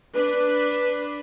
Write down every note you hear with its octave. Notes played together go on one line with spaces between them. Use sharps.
D4 B4